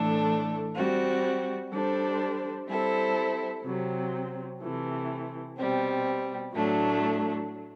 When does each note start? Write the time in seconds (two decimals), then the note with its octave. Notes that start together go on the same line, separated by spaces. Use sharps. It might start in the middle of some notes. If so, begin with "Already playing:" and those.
Already playing: A2 E3 A3 D4 A4
0.75 G3 C4 F#4
1.72 G3 D4 A4 C5
2.68 G3 C4 E4 A4
3.65 C3 F#3 C4
4.61 C3 E3 A3
5.57 B2 G3 C4
6.54 A2 F#3 A3 D4